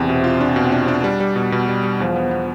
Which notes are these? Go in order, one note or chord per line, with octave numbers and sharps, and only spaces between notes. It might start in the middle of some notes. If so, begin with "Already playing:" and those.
Already playing: E2 C3
B2
F4
D4
B2
D4
D4
G3
G3
B2
B2
G3
G3
E2 F3
B3
B3